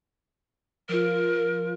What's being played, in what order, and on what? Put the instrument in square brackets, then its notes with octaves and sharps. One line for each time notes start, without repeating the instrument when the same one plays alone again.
[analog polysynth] F3 F4 [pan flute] A#4